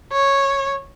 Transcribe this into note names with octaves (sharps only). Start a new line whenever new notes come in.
C#5